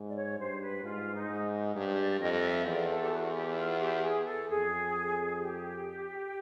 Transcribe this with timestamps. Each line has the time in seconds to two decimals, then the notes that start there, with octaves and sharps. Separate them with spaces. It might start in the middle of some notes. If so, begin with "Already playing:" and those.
Already playing: G#2
0.09 D5
0.16 C#5
0.38 G2 C5
0.61 B4
0.83 G#2 F4
1.14 D#4
1.30 G#2
1.75 G2
1.98 D5
2.20 F2 D#5
2.43 E5
2.66 E2 D5
2.89 A4
3.01 G4
3.11 F#4
3.34 G4
3.56 F4
3.79 G4
4.03 G#4
4.25 A4
4.48 F2 G#4
5.38 G4